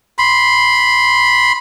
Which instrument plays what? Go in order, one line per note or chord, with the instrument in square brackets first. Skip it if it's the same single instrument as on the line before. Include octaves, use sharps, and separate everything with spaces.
[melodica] B5 C6